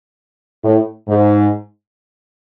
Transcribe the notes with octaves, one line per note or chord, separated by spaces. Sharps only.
A2
G#2